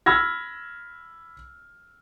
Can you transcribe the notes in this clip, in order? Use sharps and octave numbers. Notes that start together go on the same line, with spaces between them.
B5 E6 F6 G#6 A#6